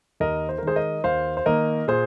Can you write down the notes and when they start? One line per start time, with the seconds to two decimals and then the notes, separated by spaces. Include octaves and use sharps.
0.20 D#2 A#4 D#5
0.49 C5
0.58 A#4
0.63 D#3 G#3 G#4 C5
0.76 A#4 D#5
1.04 D#2 C5 F5
1.37 C5
1.46 D#3 A#3 A#4 D#5
1.88 A#2 G#4 C5